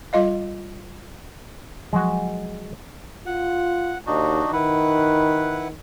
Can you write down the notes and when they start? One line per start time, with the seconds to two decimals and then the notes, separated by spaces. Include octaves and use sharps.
0.13 G3 F4 D#5 F5
1.93 F3 F#3 G#3 F#4
3.26 F4 F#5
4.07 D#2 D4 D#4 F#4
4.53 D#3 E4 B4 F#5